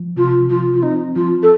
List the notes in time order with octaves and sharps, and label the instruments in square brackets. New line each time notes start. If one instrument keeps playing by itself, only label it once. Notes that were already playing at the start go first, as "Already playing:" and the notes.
Already playing: [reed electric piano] F3
[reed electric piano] C3 [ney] F4
[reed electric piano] F3 [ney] F4
[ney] F4
[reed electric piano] C4 [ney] D#4
[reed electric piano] F3 [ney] F4
[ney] A4